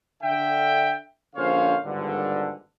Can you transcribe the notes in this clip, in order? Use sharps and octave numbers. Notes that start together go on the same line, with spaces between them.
D3 E5 G5
A#1 D3 C#4 C5 C#5 F5
G#1 G2 A#2 D3